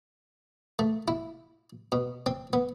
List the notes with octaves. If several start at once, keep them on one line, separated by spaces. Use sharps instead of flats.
A3
E4
B2
C4
B3